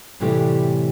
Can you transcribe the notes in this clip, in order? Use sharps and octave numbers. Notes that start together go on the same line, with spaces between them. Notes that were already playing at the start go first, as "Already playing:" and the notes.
A2 C3 E3 G3 A3 G4